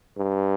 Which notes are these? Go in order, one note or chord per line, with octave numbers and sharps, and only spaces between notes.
G2